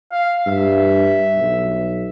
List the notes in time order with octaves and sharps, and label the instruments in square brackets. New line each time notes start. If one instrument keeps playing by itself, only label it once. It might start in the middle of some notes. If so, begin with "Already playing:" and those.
[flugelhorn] F5
[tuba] G2 [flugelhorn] E5
[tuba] B1